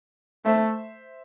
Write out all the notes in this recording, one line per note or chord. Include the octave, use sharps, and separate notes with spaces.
A3 C5 E5